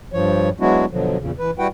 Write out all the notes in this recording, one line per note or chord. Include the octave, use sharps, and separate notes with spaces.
G2 F3 C#5
F#3 G#3 B3 D4 E4 F#4
B2 D3 F3 F#3
E2 A#2 C#3
E3 B4
G3 E4 F#4 B4 F#5 G5